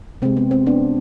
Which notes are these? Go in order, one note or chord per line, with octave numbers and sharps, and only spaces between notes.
C3 G#3 C4
B3
C4
B3 D4